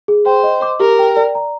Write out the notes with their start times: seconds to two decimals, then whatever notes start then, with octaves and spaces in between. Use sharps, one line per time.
0.08 G#4
0.26 C5 G5
0.43 D#5
0.62 D6
0.80 G4 A#4
0.99 G5
1.16 D5
1.35 A#5